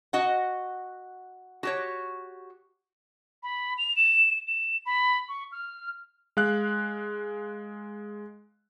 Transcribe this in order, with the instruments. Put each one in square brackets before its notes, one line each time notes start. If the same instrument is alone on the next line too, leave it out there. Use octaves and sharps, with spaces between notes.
[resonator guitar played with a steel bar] F#4 D#5 F#5
F#4 G4 C#5
[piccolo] B5
F7
E7
E7
B5
C#6
F6
[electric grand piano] G#3 F5 F#6